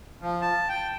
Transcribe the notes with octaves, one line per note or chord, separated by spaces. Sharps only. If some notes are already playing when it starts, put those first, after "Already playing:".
F3
A5
G5